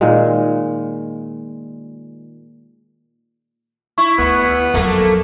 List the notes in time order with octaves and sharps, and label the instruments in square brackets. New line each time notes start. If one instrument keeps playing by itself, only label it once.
[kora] A#2 D#3 G#3
[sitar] E4 [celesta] C#6
[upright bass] D2 [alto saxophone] B3
[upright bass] F2 F#3 [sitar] A3 A#3